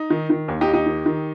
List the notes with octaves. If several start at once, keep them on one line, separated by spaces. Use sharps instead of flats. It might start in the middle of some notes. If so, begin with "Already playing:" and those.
Already playing: D#4
D#3
D#3
D#2
D#4 G4
D#2
D#4 G4
D#3
D#3